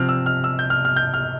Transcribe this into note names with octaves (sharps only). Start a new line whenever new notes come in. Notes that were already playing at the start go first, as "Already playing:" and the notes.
Already playing: C3 F3 C4 F6
E6
F6
E6
G6
F6
F6
G6
F6